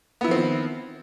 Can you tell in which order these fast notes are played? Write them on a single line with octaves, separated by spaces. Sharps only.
B3 E4 F3 C4 D#3